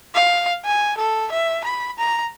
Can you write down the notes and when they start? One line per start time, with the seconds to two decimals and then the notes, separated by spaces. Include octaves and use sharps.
0.15 F5
0.65 G#5
0.98 A4
1.32 E5
1.65 B5
1.99 A#5